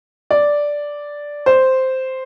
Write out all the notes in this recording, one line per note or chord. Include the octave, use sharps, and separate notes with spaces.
D5
C5